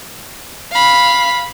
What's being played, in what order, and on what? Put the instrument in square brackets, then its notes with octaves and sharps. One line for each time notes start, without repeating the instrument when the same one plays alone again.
[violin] F5 B5